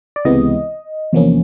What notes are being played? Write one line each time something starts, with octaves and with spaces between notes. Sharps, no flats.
D5
C#2 C3 E3 G#3 B3 D#5
E2 C3 F3 A#3 C#4